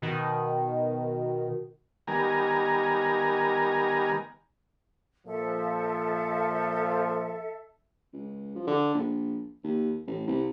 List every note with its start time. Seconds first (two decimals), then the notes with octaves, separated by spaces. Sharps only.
0.02 B2 D#3
2.07 D#3 G3 B3 A#4 G#5 A#5
5.27 A#2 F3 A4 E5
8.13 C#2
8.55 F3
8.67 D3
8.94 A#1
9.64 D#2
10.07 A1
10.28 C2